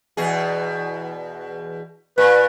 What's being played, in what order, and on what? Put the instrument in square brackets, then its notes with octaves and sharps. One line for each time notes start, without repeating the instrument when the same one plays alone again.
[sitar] E2 B2 G#4
[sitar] A#2 [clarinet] B4